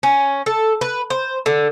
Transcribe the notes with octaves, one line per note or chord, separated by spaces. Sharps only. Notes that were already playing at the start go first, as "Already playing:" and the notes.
C#4
A4
B4
C5
D3